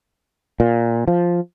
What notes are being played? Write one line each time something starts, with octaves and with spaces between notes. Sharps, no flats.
A#2
F3